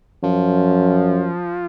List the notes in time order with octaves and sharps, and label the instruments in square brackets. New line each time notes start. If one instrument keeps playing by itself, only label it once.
[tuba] F#2 [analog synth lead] F3